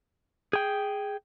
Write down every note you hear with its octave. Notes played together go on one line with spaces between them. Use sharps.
G#4 G5